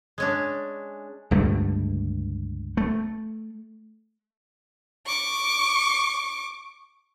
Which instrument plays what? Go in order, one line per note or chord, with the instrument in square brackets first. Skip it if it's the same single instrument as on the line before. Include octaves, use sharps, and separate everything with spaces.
[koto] G#3 C#4 D4
[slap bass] C#2 G2 D3 A3
A3
[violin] C#6 D6